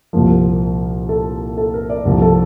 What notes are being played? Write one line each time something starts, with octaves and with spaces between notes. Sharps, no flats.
C2 A#2 F3 A#4
A#4
A4
A4
A#4
D5
C2 A#2 F3
A4